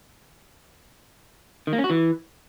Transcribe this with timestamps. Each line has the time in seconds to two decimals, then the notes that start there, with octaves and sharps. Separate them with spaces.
1.67 D#3
1.73 A#3
1.78 C#4
1.84 F#4
1.90 E3